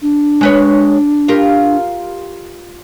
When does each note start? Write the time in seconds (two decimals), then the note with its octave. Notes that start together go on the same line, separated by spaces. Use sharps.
0.02 D4
0.41 G#3 B4 C#5
1.28 F4 G4 A#4